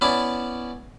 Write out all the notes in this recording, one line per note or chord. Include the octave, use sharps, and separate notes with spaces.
B3 C#4 E4 D5 A5